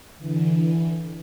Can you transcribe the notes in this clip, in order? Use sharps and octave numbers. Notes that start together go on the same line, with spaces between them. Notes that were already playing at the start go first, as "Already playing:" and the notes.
D3 E3